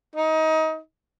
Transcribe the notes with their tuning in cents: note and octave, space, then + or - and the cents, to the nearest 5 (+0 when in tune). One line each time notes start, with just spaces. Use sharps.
D#4 +25